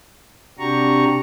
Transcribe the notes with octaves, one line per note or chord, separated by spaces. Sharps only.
C3 D4 F#4 G4 A#5 C#6